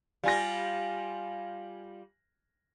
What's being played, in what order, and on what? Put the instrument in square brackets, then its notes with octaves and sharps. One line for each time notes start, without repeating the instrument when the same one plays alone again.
[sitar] G3 F4 [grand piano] F5 G#5 A#6